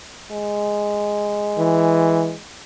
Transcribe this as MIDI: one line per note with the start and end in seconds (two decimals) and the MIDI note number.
0.31 2.41 56
1.58 2.34 52